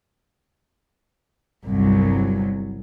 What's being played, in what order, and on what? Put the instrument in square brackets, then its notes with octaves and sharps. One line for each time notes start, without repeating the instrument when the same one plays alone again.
[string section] G1 C2 F#3